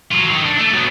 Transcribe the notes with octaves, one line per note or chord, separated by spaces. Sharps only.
F#3 F4
D#3
D4
A3
F#3 B3